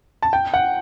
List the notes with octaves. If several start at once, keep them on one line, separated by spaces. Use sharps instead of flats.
A5
G5
F#5